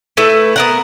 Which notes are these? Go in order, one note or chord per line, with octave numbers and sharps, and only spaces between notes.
A3 E4 B4
B3 A#4 F#5